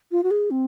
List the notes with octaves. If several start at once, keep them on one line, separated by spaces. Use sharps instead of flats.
F4
F#4
G#4
C4